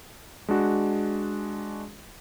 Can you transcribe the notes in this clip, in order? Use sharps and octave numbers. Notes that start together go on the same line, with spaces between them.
G#3 D4 F#4